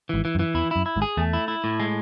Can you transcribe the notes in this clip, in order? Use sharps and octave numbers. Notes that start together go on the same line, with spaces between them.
G#1 G#2 E3
E3
F#2
E3
E2 E4
F#2 E4
E4
G#1 G#2
G#4
E2 A3
E4
E4
A2
G#3